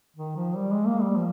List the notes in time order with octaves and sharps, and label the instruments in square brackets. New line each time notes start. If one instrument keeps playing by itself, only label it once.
[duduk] D#3
F3
G3
G#3
A#3
G3
F3